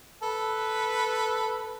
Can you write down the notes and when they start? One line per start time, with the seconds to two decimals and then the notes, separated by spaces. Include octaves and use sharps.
0.23 A4 B4